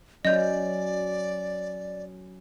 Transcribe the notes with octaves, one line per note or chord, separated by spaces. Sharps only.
F#3 C#4 D5 D#5 G6